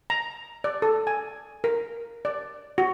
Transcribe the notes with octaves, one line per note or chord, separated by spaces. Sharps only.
A#5
D5
A4
G#5
A#4
D5
F#4